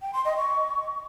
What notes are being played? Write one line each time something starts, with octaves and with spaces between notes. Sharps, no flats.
G5
C6
D#5
C#6